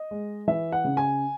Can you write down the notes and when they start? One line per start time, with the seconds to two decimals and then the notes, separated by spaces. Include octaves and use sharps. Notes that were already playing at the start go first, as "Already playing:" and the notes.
Already playing: D#5
0.11 G#3
0.48 E3 E5
0.72 F#5
0.84 C#3
0.97 G#5